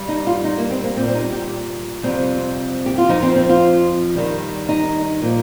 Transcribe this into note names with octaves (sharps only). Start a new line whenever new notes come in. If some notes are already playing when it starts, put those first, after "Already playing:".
Already playing: G2 G3
D#4
F4
D#4
A#3
C4
A#3
A#2 G3 C4
C4
D#4
G4
F2 C3 G3 C4
G4
F4
F2 F3 D#4
C4
C4
F4
G2 D#3 G3
D#4
A#2 F3